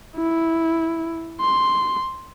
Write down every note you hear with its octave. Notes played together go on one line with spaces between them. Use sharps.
E4
C6